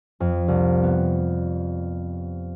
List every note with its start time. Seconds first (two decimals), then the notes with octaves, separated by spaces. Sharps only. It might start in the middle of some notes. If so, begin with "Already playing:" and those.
0.20 F2
0.48 C2
0.83 B3